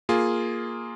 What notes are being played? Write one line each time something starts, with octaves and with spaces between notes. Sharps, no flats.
A#3 F4 G#4